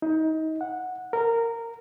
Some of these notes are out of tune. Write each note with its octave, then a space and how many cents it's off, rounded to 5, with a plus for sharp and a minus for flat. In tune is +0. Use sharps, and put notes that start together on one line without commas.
D#4 +25
F#5 -10
A#4 -15